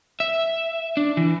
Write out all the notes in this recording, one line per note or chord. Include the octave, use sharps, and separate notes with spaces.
E5
D4
E3